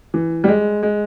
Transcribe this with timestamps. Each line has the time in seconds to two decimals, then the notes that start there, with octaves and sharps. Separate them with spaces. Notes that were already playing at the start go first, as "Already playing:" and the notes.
0.14 E3
0.44 G3
0.48 G#3
0.83 G#3